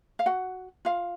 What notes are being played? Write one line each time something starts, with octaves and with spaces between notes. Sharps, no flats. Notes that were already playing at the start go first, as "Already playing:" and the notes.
F5
F#4 F#5
F4 F5